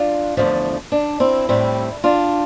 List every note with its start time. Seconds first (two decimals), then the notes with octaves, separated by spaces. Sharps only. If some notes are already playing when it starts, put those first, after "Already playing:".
Already playing: D4 F4
0.37 E2 D3 F3 A3
0.92 D4
1.20 C4 E4
1.49 A2 G3 C4
2.04 D4 F4